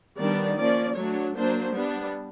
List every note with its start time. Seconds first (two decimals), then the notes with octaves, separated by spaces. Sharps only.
0.18 D#3 G3 B3 D4 D5
0.56 F3 A#3 C#4 D5
0.96 F#3 A3 D4 C#5
1.35 F#3 A#3 D4 C5
1.74 G3 B3 D4